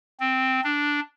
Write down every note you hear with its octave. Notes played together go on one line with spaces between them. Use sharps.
C4
D4